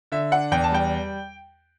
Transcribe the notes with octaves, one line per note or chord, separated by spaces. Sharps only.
D3 E5
D4 F#5
E2 G5
A5
G3 G5